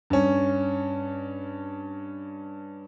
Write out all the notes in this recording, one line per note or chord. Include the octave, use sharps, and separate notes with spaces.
G2 C#4